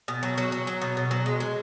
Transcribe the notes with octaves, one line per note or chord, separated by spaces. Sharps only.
B2
F#3
F#3 F#4
F#3
F#3
B2
B2
F#3
G#3
G#3